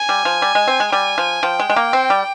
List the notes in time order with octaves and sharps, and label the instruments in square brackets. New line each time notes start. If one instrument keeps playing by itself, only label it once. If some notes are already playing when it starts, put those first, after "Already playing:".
Already playing: [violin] G#5
[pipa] G3
F3
G3
G#3
C4
G#3
[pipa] G3 [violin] G#5
[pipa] F3
[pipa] F3 [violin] G5
[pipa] G#3
G#3
A#3
C4
G3